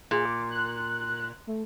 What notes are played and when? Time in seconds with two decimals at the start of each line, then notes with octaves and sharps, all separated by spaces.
0.11 A#2 G#4
0.25 D6
0.50 F#6
1.47 A3